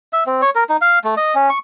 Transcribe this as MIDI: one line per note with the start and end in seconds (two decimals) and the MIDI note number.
0.13 0.24 76
0.26 0.41 60
0.42 0.50 73
0.55 0.64 70
0.69 0.77 63
0.81 0.99 77
1.04 1.15 57
1.17 1.35 75
1.35 1.49 61
1.50 1.58 85